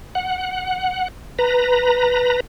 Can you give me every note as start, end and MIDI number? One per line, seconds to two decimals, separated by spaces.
0.15 1.08 78
1.39 2.40 71
1.39 2.40 82